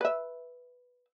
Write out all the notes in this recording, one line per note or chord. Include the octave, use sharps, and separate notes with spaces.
B4 E5